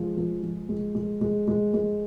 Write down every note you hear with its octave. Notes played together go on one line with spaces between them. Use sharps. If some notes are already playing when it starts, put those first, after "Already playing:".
Already playing: F3 G#3
F3
F3
G#3
G#3
G#3
G#3
G#3